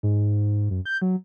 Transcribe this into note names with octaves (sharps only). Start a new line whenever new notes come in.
G#2
F#2
G6
F#3